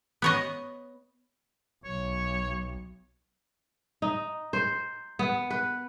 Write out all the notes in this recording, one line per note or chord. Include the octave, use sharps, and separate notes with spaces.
B3 C#5 D#5
B1 C#5
D#4
C5
B3
B4